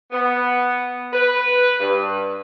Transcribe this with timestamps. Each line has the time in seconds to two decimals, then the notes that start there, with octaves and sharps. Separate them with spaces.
0.12 B3
1.13 B4
1.80 G2